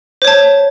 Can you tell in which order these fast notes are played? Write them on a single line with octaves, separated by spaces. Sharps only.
C5 C#5 A5